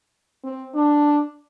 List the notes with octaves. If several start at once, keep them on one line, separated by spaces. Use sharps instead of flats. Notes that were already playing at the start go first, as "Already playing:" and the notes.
C4
D4